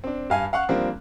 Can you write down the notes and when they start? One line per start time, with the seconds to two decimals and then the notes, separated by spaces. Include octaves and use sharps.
0.04 C4 D4
0.30 G2 F5 G#5
0.53 F5 F#5 C#6 F#6
0.69 F3 G3 A#3 C4 D4